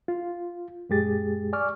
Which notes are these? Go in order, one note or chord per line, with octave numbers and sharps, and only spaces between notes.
F4
F#2 A#2 G#3 G4 G#4 A6
D5 G#5 C#6 D6 F6